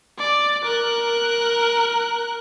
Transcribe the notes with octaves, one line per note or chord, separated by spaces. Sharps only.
D5
A#4 F#6